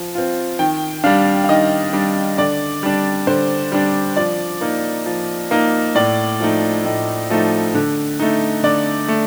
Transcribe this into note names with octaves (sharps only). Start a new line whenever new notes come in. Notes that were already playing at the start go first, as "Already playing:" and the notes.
Already playing: F3
C4 F4
D#3 G5
G3 D4 F5
F5
D#3 D#5
G3 D4
D3 D5
G3 D4
D3 C5
G3 D4
F3 D5
A#3 D#4
F3
A#3 D#4
A2 D5
F3 A3 D#4
A2 D#5
F3 A3 D#4
D3
A3 D#4
D3 D5
A3